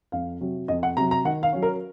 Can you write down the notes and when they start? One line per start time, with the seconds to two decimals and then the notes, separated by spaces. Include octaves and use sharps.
0.12 F2 F5
0.41 C3 F#3
0.68 F2 D#5
0.83 F#5
0.97 C3 F#3 A#5
1.11 A#5
1.25 D#3 F#5
1.43 F5
1.53 F#3 C#4
1.62 A#4